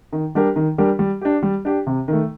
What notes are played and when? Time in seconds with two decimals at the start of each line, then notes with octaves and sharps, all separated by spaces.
0.12 D#3
0.35 G3 D4 G4 A#4
0.56 D#3
0.78 G3 D4 G4 A#4
0.99 G3
1.21 D4 G4
1.43 G3
1.65 D4 G4
1.87 C3
2.08 D#3 A3